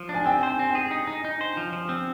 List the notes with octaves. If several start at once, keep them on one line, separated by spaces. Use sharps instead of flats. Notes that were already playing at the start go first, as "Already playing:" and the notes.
Already playing: F3
D4
G#5
C4 G5
C5 G#5
C4
G#4 G5
D#4
D#4
D#4
C5
F3
F3
C4